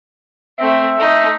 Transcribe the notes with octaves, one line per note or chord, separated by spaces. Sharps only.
A3 C4 E5
A3 D#4